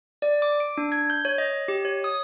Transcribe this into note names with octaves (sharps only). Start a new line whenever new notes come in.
D5
D6
D7
D4
G#6
G6
C#5
D#5
G4
C#5
D#6